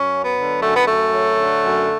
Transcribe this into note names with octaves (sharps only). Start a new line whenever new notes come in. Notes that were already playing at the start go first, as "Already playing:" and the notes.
Already playing: F#2 C#4
F#3
B3
D3
F#2 A3
B3
F#2 A3
F#3
D3
F#2